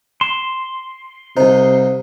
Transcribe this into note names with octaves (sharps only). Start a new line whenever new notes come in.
C6 E7
C2 C3 D#4 C5